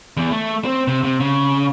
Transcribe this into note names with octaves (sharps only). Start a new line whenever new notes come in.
E2
A3
C4
C3
C3
C#3